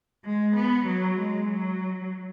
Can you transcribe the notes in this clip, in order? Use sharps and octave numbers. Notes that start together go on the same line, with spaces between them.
G#3
B3
F#3
G#3
F#3